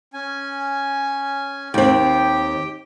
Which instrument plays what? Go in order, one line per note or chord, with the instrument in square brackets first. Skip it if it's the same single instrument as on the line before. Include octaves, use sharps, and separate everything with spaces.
[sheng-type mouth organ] C#4 G#5
[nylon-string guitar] D#2 C4 [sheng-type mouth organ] G4 G5